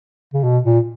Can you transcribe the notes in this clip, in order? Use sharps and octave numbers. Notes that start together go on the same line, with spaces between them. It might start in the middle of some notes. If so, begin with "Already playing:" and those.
C#3
B2
A#2